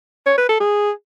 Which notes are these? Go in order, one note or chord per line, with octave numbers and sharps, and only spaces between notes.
C#5
B4
A4
G#4